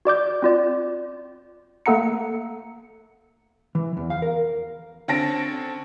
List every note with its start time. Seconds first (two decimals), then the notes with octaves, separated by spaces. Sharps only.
0.05 F#4 D5 D6 G6
0.42 C4 F4 D5
1.86 A3 A#3 A4 F#5 A#5 C#7
3.75 E3
3.97 E2
4.10 F5
4.22 A#4
5.08 D3 C4 C#4 A5 A#6 D7